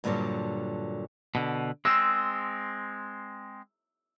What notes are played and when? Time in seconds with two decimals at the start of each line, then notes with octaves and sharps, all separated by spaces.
0.04 G2 A#2 D3 D#3 F#3 G3
1.35 B2 D3
1.85 G#3 C4 E6